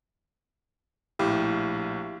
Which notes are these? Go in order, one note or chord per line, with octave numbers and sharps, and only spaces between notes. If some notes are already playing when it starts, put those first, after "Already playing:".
A#1 A2 E4 G4 F5